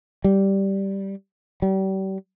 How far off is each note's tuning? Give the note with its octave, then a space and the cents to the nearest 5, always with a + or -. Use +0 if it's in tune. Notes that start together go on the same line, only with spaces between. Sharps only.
G3 -5
G3 -35